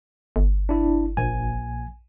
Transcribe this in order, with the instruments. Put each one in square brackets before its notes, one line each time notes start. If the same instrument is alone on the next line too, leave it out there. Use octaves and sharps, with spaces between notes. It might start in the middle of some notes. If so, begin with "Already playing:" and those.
[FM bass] G1
[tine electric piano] D4 E4
A#1 G#5